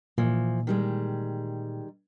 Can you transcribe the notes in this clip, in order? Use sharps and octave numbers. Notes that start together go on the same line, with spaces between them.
A#2 E3 F3
D#3 G3 G#3